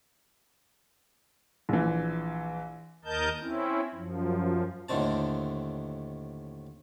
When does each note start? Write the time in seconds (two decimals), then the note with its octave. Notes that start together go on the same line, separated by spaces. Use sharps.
1.69 A#1 E3
3.05 D#2 A#4 D#5 A5 G6
3.41 C4 C#4 E4
3.95 F#2 F3
4.89 D#2 A2 D3 D#3 C4 A5